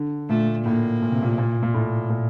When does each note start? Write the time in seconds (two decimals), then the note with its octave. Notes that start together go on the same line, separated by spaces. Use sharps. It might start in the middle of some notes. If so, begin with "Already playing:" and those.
Already playing: D3
0.29 A#2 A3
0.65 A2 A#3
1.02 A#2
1.12 C3
1.22 A#2
1.38 A#2
1.63 A#2
1.74 A2
2.10 A#2